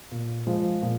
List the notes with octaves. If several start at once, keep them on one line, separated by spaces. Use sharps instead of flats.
A#2
F3 G#3
A#2